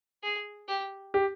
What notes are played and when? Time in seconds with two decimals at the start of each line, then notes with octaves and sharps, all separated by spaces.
0.23 G#4
0.68 G4
1.14 G4